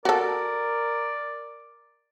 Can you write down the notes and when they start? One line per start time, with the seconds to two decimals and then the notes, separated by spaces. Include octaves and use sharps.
0.05 F#4 A4 A#4 D5